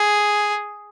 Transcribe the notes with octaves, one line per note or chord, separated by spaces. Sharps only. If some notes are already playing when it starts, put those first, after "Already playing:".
Already playing: G#4